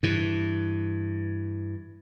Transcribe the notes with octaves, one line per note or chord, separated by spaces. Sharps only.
G2 E3